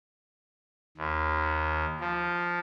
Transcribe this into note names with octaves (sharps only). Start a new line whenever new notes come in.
D#2
F3